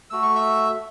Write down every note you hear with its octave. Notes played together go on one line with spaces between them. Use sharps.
A3 F#4 E6
C#6
E5 E6